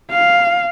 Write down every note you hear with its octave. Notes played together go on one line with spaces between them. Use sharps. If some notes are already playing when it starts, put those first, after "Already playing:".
F5